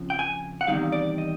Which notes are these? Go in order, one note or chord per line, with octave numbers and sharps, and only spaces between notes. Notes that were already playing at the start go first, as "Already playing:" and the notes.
Already playing: F2 C#3 F3
G5
G#5
F#5
E2 C3 D#3 G3 F5
D5
D#5